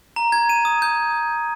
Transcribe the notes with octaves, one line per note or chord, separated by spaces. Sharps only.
A#5
G#6
D#7
D#6
G6